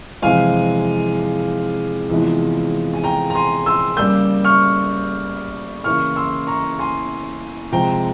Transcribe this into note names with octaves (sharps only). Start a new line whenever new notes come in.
F2 C3 E3 G#3 F5 G#5
E2 C3 F3 G#3 E4
G#5
G5 A#5
A#5
G#5 C6
C6 E6
C#3 G3 A#3 E6 G6
C#6 F6
C#3 E3 A#3 E4 C#6 F6
C6 E6
A#5 C#6
G#5 C6
C3 F3 G#3 G5 A#5